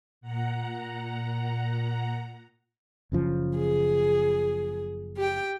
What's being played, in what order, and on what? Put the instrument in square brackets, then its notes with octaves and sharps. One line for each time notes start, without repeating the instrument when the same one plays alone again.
[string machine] A#2 F#5 A#5
[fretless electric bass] F#1 C#3 F3
[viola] G#4
G4 G5